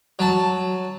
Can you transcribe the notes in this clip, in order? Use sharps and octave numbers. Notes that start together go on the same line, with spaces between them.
F#3 A5